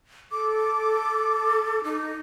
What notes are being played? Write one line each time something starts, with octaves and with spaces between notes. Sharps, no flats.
A4 D6
D#4